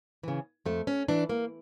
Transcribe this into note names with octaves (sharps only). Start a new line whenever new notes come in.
C#3 E3
F2 A3
C#4
E3 D4
A#3